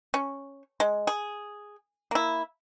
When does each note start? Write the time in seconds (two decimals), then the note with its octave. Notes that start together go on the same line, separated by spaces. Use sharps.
0.14 C#4
0.80 G#3
1.07 G#4
2.11 A#3 E4